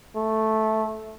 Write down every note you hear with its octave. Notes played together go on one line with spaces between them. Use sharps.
A3